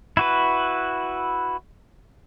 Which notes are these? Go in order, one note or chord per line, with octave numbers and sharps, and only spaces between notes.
E4 F#4 B4